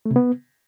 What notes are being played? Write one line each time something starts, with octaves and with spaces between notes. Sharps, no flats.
A3
C3
B3